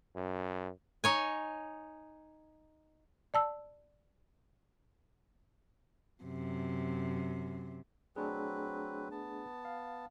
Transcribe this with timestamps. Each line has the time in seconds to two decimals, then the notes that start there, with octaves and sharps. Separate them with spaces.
0.16 F#2
1.04 D#4 C#5 G#5
3.34 D5 A5 E6
6.24 F#2 C3
8.16 F#3 A3 C4 D4 G#4 B4
9.11 B3 A5
9.65 F5